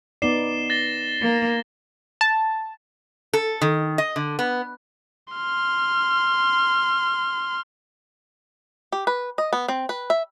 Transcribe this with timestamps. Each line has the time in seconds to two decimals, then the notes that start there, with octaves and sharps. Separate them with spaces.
0.22 B3 D#4 D5 C7 E7 G7
0.70 A6 A#6 G7
1.22 A#3
2.21 A5
3.34 A4
3.61 D#3
3.98 D#5
4.16 D3
4.39 B3
5.34 C6 F6
8.92 G4
9.07 B4
9.38 D#5
9.53 B3
9.68 C4
9.89 B4
10.10 E5